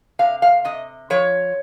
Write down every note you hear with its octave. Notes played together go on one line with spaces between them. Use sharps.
C3 F5
F5
C3 D#5
F3 C#5